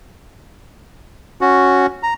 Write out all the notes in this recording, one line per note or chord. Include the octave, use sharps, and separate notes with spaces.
C#4 F#4
A#5